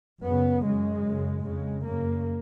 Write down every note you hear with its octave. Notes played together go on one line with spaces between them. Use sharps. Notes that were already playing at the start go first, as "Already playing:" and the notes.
F#2 C#3 B3
F#2 C#3 G#3
F#2 C#3
F2 C#3 G#3
F#2 C#3 A#3